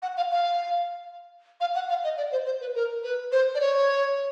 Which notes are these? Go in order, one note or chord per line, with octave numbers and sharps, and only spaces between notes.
F#5
F5
F5
F5
F#5
F5
D#5
D5
C5
C5
B4
A#4
B4
C5
D5
C#5